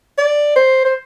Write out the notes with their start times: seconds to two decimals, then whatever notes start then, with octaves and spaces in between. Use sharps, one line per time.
0.18 D5
0.56 C5
0.85 C5